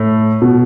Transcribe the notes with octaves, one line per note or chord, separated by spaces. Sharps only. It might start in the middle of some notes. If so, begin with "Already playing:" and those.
Already playing: A2
B2